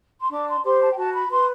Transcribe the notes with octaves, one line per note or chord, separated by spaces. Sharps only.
C6
D4 D6
C6
G4 C5 C6
A5
G5
F#4 A5
B5
B4 C6